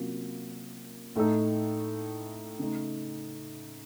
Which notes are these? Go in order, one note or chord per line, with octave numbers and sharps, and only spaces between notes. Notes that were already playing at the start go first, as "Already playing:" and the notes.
Already playing: C3 F#3 A#3 C#4 F4
A2 A3 D#4 A4
C#3 A3 D#4